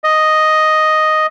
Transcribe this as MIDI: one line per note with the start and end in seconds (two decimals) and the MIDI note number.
0.04 1.26 75